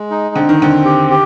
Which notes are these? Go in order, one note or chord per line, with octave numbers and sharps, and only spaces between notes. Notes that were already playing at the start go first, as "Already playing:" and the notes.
Already playing: G#3
D#4
D3 C4
D#3
D3 C4
G4
G4